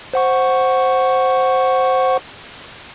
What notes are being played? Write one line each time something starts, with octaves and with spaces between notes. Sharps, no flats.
C5 F#5 C#6